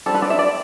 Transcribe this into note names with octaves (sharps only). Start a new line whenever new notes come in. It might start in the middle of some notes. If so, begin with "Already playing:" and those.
G3 C4 A4
B4
D5
E5
D5